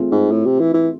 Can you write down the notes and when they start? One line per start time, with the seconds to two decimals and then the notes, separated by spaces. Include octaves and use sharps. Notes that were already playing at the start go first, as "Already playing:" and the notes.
Already playing: A3 C4 F4 G#4
0.11 G#2
0.31 A2
0.46 C3
0.59 E3
0.74 E3